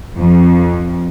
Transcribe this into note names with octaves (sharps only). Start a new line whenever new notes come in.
F2